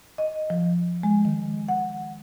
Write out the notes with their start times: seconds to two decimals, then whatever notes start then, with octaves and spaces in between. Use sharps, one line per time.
0.18 D#5
0.50 F3
1.03 G#3
1.25 D#3
1.68 F#5